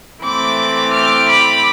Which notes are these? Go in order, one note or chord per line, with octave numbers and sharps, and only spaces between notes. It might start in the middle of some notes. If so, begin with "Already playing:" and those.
E3 A3 C4 B5 D6
D6 F6
B5 D6